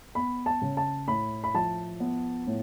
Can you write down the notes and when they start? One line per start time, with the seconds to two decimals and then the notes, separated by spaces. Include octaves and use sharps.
0.15 B3 B5
0.46 A5
0.62 C#3
0.77 A5
1.08 A2 B5
1.44 B5
1.54 F3 A5
2.00 B3
2.47 A2